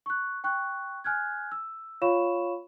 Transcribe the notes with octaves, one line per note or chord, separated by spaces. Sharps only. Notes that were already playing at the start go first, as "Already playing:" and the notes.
C#6 F#6
G5 C#6 F#6
G#5 F6 F#6 G#6
E6
F4 C#5 F5 B5 C#6 E7